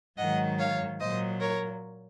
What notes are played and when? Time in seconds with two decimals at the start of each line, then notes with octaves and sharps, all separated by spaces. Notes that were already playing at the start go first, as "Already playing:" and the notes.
0.18 G#2 D#3 F#3 D#5 F#5
0.59 C#5 F5
1.00 A#2 F#3 C5 D#5
1.40 A#4 C#5